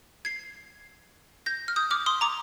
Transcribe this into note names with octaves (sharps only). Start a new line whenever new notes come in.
G#6 C7
G6 A#6
F6
D#6 G6
D6 F6
C6 D#6
A#5 D6